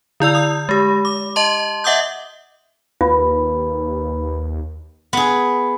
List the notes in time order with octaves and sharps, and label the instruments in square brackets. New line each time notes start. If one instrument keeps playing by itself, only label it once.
[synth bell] D3 E4 D5 E6
D#6
G#3 G4
D6
D#5 A5 C6
D#5 E5 F#5 D6 D#6 G6
[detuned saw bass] D#2 [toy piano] F4 [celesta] B4 B5
[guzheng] B3 G#4